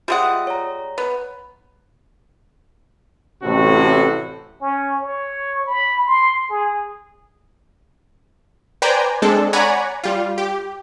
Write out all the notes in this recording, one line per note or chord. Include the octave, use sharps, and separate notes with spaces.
G3 G#3 F4 E5 F#5 D#6
C#5 A#5
B3
A1 A2 C3 C4 F#4 A4
C#4
C#5
B5
C6
G#4
B4 C5 D5 G5 G#5 A#5
G#3 C4 D4 A4
C#5 D5 F#5 G#5 A#5 B5
G3 F4
G4